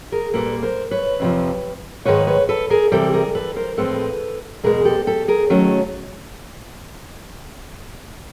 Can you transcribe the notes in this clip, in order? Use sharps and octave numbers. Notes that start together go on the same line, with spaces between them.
G#4 A#4
A#2 G3 A#3 A4 B4
A#4 C5
B4 C#5
F2 C3 F3
G#2 D#3 G#3 B4 C#5
B4 C#5
A4 B4
G#4 A#4
C3 E3 G3 G4 A4
G#4 A#4
A4 B4
A#4 C5
A2 F3 G#3 C4 A4 B4
E2 B2 G#3 G#4 A#4
G4 A4
G4 A4
G#4 A#4
D#3 F#3 A3 C#4